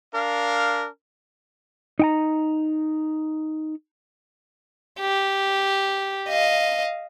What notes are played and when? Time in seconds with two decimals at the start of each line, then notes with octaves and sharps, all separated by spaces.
0.14 D4 A#4 F5
1.99 D#4 G5 A#5
5.00 G4
6.29 D#5 F5